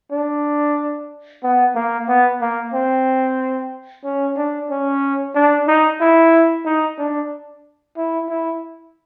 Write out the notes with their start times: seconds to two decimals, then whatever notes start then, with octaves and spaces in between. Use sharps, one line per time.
0.12 D4
1.43 B3
1.75 A#3
2.08 B3
2.41 A#3
2.74 C4
4.05 C#4
4.37 D4
4.70 C#4
5.35 D4
5.68 D#4
6.01 E4
6.65 D#4
6.98 D4
7.97 E4
8.29 E4